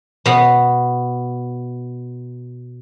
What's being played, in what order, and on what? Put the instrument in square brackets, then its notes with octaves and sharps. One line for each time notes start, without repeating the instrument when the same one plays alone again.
[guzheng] B2 B3